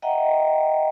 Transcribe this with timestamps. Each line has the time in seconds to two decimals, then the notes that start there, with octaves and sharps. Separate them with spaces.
0.02 D#5 E5 F#5 G5 A#5